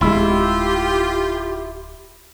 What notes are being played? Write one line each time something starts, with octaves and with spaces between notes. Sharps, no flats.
D1 G#3 E4 F4 G4